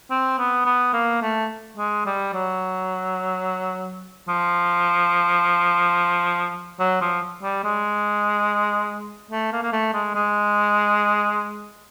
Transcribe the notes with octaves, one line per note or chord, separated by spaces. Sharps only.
C4
B3
B3
A#3
A3
G#3
G3
F#3
F3
F#3
F3
G3
G#3
A3
A#3
A#3
A3
G#3
G#3